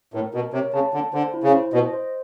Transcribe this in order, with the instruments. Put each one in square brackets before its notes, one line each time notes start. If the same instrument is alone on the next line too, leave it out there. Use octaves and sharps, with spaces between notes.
[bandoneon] A2 [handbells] A#4
[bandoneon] B2 [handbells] A#4
[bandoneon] C3 [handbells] C#5
[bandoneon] C#3 [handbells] A5
[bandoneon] D3 [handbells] A5
[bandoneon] D3 [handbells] C5
[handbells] E4
[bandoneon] C#3
[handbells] C5
[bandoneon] B2 [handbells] D#5
[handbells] C5